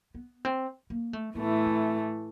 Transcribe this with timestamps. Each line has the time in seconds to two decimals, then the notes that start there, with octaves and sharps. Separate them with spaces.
0.14 B3
0.45 C4
0.90 A#3
1.13 A3
1.35 A2 E3 A3 B3
1.66 C4